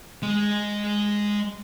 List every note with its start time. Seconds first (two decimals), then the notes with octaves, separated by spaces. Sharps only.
0.23 G#3 D#5